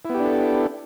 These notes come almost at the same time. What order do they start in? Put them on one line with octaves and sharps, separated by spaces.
E4 B3 G4 D4 A4